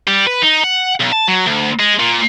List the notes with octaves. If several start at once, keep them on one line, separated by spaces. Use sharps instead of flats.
G3
B4
D#4
F#5
B1
A5
F#3
D2
G#3
A#2